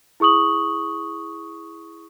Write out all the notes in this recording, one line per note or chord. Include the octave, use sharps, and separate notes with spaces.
E4 G#4 C#6 D#6 F#7